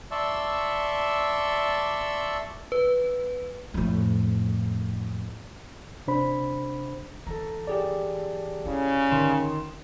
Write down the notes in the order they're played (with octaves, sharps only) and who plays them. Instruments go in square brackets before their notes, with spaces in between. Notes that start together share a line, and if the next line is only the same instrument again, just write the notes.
[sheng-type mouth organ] D5 E5 A5 C6 C#6 E6
[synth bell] B4
[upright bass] F2 A2
[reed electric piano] C3 D4 C5 B5
[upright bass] E3 [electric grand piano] A4 A#5
[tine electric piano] G4 G#4 D5
[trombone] C#3 [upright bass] E4
[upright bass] D3 [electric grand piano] D#3 C6 E7